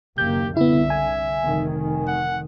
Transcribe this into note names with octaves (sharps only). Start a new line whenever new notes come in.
F#1 D#2 A#3 G4 G6
C2 D3 B3 E4 E5
G#5
F1 D#3
F#5